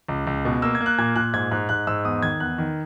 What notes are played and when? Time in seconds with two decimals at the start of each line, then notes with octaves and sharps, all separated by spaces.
0.08 C#2
0.27 C#2
0.45 B2
0.62 A#3 E6
0.75 G#6
0.81 A#3
0.86 F#6
0.98 A#2 G#6
1.16 A#2 F#6
1.33 G#2 G#6
1.51 G#2 F#6
1.69 G#2 F#6
1.87 G#2 E6
2.04 E2 D#6
2.22 D#3 G#6
2.40 E2 F#6
2.58 D#3